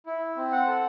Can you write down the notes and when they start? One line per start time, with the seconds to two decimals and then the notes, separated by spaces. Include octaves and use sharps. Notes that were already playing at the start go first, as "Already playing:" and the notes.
0.06 E4
0.37 C4
0.52 F#5
0.67 A4